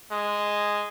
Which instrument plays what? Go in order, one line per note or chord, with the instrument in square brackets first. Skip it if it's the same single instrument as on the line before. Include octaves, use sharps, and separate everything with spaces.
[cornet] G#3